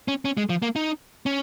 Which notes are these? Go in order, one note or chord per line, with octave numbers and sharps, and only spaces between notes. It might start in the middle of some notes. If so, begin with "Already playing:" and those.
C#4
C#4
G#3
F3
A#3
D#4
C#4